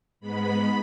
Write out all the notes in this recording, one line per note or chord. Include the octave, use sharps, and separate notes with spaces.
G#2 G#3 B3 B5